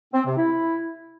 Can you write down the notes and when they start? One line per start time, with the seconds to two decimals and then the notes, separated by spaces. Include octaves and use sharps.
0.13 C4
0.25 C3
0.37 E4